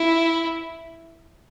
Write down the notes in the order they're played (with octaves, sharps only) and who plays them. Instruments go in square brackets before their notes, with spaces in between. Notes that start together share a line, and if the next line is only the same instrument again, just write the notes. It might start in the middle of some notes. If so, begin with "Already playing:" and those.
Already playing: [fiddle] E4